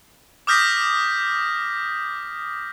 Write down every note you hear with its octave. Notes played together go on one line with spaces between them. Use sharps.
D6 D#6 F6 G6 A#6 B6